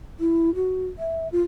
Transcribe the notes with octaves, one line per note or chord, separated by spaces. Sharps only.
E4
F#4
E5
F4